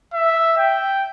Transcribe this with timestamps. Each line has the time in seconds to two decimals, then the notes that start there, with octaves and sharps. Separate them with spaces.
0.14 E5
0.58 G5